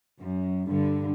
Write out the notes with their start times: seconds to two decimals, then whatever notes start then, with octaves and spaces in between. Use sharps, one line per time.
0.21 F#2
0.69 G2 D3